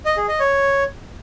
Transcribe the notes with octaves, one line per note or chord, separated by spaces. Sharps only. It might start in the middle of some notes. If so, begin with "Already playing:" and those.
D#5
G#4
D#5
C#5